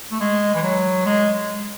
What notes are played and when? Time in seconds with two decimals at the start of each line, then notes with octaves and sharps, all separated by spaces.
0.12 A3
0.20 G#3
0.55 E3
0.63 F#3
1.06 G#3